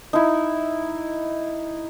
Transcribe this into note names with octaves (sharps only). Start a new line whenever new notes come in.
D#4 E4